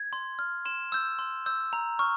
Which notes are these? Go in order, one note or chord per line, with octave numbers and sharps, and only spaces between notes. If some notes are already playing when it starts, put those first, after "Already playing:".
Already playing: G#6
C6
F6
C6 E7
E6 G6
C6
E6 G6
A#5
C#6 F6